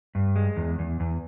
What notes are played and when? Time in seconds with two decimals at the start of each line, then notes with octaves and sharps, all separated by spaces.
0.15 G2
0.36 G#3
0.57 E2
0.79 E2
1.00 E2